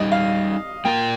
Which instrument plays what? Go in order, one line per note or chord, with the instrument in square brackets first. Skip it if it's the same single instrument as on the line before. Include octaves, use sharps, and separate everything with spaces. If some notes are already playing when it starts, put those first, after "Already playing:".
Already playing: [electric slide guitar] G3 D#4 G4 [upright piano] D#5
[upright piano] F5
[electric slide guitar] A#3 F4 A#4 [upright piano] G5